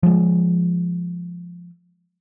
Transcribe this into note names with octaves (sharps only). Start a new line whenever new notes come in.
F3 G#3